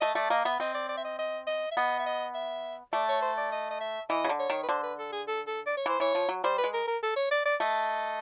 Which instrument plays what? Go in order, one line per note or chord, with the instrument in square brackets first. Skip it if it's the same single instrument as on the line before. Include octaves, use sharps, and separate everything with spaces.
[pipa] A3 [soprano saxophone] D#5
[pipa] A3 [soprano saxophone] D5
[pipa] A#3 [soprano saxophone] D#5
[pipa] B3 [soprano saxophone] E5
[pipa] C4 [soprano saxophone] D#5
[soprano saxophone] D5
D5
E5
D#5
D#5
D#5
E5
[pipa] B3 [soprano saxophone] D#5
[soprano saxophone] E5
D#5
E5
[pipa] A3 [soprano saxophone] D5
[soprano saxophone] C#5
C5
D5
D#5
D#5
E5
[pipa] E3 [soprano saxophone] D#5
[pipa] C#3
D3
[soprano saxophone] C#5
[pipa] D#3
[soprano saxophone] B4
[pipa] D3 [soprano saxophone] C5
[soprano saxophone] B4
A4
G#4
A4
A4
D5
C#5
[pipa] E3 [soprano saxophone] C5
[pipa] E3 [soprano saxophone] C#5
[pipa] F3
F#3
[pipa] G3 [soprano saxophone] C5
[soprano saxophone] B4
[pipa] G#3
[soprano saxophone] A#4
A#4
A4
C#5
D5
D5
[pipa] A3 [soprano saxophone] D#5